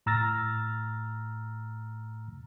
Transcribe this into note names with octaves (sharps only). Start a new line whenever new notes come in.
A2 A#5 E6 F6 A6 A#6